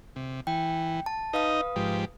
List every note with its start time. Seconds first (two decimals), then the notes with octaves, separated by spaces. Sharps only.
0.16 C3
0.47 E3 G5
1.06 A5
1.33 D#4 B4 D#5 F5 D#6
1.76 G#2 F3 G4